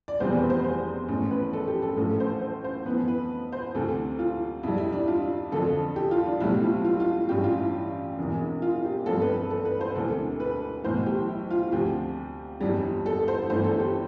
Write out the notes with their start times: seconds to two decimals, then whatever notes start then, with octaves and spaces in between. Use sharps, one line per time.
0.08 D5
0.20 F1 E2 B2 G3 C4 C5
0.35 B4
0.50 C5
0.64 C5
1.08 A1 A2 E3
1.31 B4
1.53 A4
1.68 G4
1.82 A4
1.97 A1 A2 F3 A4
2.20 C5
2.41 C5
2.64 C5
2.86 F2 E3 B3 B4
3.08 B4
3.52 C5
3.75 D2 C3 E3 A4
4.19 F4
4.63 F2 C3 G3 E4
4.78 E4
4.93 D4
5.08 F4
5.52 F2 D3 F3 A4
5.96 G4
6.11 F4
6.26 D4
6.40 B1 A2 G3 C4 E4
6.62 F4
6.85 F4
7.00 F4
7.29 A1 G2 E3 G4
7.44 F4
7.59 E4
8.18 E1 E2 C3 E3
8.62 F4
8.85 G4
9.06 G1 G2 F3 A3 C4 A4
9.21 B4
9.36 A4
9.50 A4
9.65 B4
9.81 C5
9.95 E1 D2 C3 E3 A4
10.40 B4
10.84 B1 A2 E3 C5
11.06 G4
11.29 E4
11.51 F4
11.72 D2 C3 F3 G4
12.61 G1 F2 E3 G3
13.06 A4
13.28 C5
13.50 G1 G2 E3 A3 C5
13.64 A4
13.80 G4